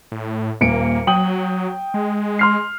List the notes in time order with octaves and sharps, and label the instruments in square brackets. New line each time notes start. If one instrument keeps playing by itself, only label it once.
[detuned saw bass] A2
[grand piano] D#1 C#7 D7 [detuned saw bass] A#3
[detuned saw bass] F#3 [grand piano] G5 D#6 F#7
[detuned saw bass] G#3
[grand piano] C6 F6 C7